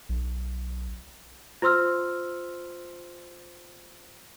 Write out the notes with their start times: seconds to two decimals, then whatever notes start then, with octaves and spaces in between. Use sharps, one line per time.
0.09 B1
1.62 F4 C5 C6 E6 F6